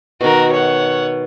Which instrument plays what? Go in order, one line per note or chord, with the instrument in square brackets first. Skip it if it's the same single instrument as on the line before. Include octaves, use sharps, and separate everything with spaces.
[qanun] B2 D#3 [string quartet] F#4 A#4
[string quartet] C#5 F#5